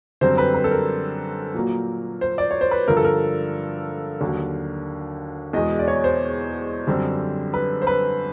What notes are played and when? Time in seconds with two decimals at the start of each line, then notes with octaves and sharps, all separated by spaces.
0.21 F#2 D3 G3 C4 C5
0.38 B4
0.55 B4
0.64 A4
0.71 A#4
1.54 A#2 F#3 A#3
2.21 C5
2.38 D5
2.51 C#5
2.61 C5
2.71 B4
2.88 G2 D3 F3 A#4
2.97 A4
3.04 A#4
4.21 D#2 D3 F#3
5.53 E2 B2 G#3 D#5
5.79 D5
5.88 C#5
6.04 C5
6.87 F#2 D3 G3 C4
7.54 B4
7.82 C5
7.87 B4